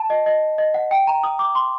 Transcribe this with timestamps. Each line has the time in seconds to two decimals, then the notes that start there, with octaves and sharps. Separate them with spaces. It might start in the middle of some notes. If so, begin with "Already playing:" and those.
Already playing: A5
0.10 D#5
0.26 D#5
0.58 D#5
0.74 F#5
0.91 G5
1.07 A#5
1.23 D#6
1.39 D6
1.55 C6